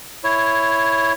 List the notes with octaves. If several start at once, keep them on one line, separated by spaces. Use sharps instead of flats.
E4 C#5